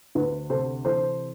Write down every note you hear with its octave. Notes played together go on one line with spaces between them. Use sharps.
D2 B4
C3 A4 C5
E3 A4 C5